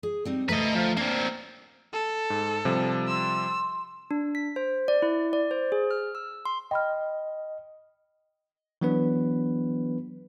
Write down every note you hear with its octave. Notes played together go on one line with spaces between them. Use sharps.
G#4
G3 C4 D#4
D2 A3 B4 D#5 A#5
F3
A#3 C4 D4
A4
G#2
C3 F3 G3
C6 E6
D4
B6
C5
D5
E4
D5
C5
G#4
F6
E6
C6
D#5 G5 B5 F6
E3 F#3 B3 D4 B4